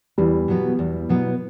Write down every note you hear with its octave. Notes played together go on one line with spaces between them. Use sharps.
E2 E3 G3
B2 F#3 B3
E2
B2 F#3 B3